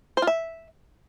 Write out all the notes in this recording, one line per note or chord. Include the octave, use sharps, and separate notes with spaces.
C5
F4
E5